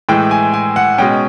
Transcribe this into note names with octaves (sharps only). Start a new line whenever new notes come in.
A2 E3 G#3 G5
G#5
G#5
F#5
B2 G#3 C#4 G5